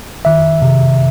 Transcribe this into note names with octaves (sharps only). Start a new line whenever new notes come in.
D#3 E5
C3